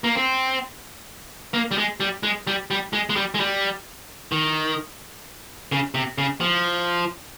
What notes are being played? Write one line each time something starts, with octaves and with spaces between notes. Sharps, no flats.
A#3
C4
A#3
G3
G#3
G3
G#3
G3
G3
G#3
G#3
G3
G#3
G3
D#3
C#3
C3
C#3
F3